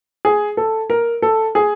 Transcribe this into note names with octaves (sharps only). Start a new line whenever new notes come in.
G#4
A4
A#4
A4
G#4